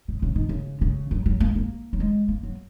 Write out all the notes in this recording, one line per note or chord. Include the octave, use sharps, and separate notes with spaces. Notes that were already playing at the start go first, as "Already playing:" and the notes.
C#3
C#3
D#3
C#3
C#3
F#3
F#3
A#3
A#3
F#3
G#3
A#3
F#3